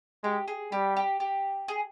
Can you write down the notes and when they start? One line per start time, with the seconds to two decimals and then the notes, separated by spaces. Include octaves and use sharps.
0.24 G#3 G4
0.48 G#4
0.72 G3 G4
0.97 G4
1.20 G4
1.68 G#4